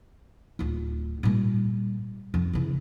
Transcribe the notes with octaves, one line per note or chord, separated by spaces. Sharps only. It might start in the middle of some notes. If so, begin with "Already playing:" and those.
D1 F4
A#2 G3
F2
C#3 E3